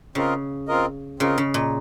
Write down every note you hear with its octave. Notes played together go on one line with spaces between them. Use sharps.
C#3 C4 F4 A#4 D#5
C4 F4 A#4 D#5
C#3 C4 F4 A#4 D#5
C#3
A#2